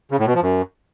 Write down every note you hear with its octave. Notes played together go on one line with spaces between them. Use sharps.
C#3
A2
B2
F3
F#2